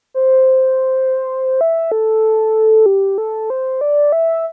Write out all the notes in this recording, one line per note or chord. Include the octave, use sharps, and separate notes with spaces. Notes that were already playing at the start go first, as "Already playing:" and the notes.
C5
E5
A4
G4
A4
C5
D5
E5